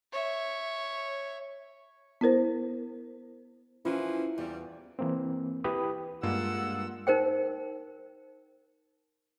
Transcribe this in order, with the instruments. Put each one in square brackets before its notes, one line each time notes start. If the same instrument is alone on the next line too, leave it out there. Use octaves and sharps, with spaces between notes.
[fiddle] C#5 E5
[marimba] B3 E4 A#4 C5
[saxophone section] F#2 E3 F3 [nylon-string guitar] C#4 [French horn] E4 [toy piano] F4
[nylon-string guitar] E2 [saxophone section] C#3 G3
[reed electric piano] E3 A#3 C4
E4 G4 B4 G5 B5 D#6
[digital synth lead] G2 [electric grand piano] G#3 A#3 F4 [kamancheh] F#5 E6
[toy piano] D#4 A#4 C5 G5